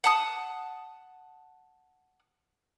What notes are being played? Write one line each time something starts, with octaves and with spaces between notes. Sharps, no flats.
F#5 A5 D#6